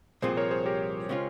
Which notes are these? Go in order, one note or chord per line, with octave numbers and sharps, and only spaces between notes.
C2 A#2 F3 C4 G#4 C5
A#4 C#5
G#4 C5
G4 A#4
C#3 G#3 C#4 F4